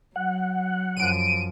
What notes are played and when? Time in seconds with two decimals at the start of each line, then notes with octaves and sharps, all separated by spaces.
0.16 F#3 F#5
0.97 F#2 F3 D7 D#7